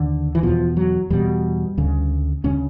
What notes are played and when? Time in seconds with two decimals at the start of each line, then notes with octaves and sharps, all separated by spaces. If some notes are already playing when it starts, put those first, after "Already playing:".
Already playing: D#2 D3
0.35 E3
0.43 E2 B2 F3
0.77 F#3
1.10 E2 B2 G3
1.78 D2 C#3
2.44 D2 C#3 C#4